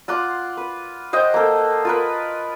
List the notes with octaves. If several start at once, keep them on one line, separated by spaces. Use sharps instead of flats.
F4 F#5 C6 D6
B4
C5 D#5 F#5 G5
A#3 A4
F4 A#4 B4